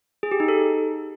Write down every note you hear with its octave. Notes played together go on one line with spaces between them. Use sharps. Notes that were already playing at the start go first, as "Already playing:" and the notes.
G#4
G4
D#4
A4